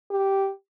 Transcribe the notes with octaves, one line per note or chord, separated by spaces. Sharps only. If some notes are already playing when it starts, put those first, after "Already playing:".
G4